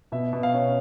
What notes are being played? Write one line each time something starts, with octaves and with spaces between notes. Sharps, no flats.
B2 E5
B2
F5
C#4